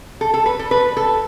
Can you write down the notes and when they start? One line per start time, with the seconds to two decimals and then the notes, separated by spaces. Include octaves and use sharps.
0.21 A4
0.34 A4
0.46 B4
0.59 A4
0.71 B4
0.97 A4